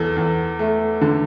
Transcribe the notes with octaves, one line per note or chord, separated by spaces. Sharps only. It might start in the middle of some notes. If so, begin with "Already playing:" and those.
Already playing: E2 A4
E2
A3
D3